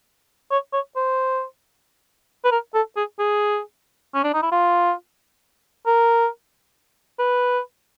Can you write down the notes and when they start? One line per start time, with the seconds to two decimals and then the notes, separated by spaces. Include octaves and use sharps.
0.51 C#5
0.73 C#5
0.96 C5
2.45 B4
2.51 A#4
2.75 A4
2.97 G#4
3.19 G#4
4.15 C#4
4.24 D4
4.34 D#4
4.43 E4
4.52 F4
5.86 A#4
7.19 B4